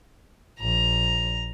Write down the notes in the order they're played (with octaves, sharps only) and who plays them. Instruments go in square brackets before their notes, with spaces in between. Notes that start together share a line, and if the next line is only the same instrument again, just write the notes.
[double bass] A#1 [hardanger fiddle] A#5